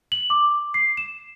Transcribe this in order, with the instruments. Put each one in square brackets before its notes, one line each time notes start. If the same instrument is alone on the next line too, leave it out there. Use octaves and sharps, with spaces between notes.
[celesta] F#7
D6
C7
E7